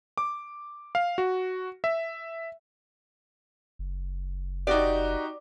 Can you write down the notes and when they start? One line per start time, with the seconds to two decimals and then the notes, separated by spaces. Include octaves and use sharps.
0.18 D6
0.95 F5
1.18 F#4
1.84 E5
3.79 F#1
4.67 D#4 F#4 G4 D5